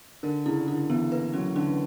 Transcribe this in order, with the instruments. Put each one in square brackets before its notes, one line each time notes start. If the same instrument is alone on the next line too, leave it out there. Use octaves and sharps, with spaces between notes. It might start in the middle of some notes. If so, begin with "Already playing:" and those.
[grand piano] D3 [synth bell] A#4
[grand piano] C#3 [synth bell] E4
[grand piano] D3 [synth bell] E4
[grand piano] E3 [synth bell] B3
[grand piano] A#3 [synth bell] B4
[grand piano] F#3 [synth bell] C#4
[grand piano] D3 [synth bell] C#4